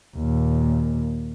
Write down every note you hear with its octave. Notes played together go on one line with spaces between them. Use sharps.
D#2 A#2